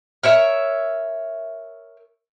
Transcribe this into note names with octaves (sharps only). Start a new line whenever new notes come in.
A#4 C#5 E5